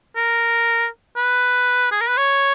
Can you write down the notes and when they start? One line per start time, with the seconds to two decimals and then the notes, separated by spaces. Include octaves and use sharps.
0.16 A#4
1.17 B4
1.92 G#4
2.01 A#4
2.09 B4
2.18 C#5